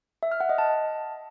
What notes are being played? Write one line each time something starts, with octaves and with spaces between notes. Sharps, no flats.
E5
F6
F#5
D#5
A5